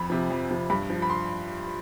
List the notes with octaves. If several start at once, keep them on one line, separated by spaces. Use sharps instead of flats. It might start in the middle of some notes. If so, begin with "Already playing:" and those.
Already playing: F2 B5
C3 F3
F2
C3 F3
G2 B5
F3
B5
C6